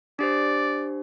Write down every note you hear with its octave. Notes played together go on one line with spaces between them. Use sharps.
D4 G4 C5 D5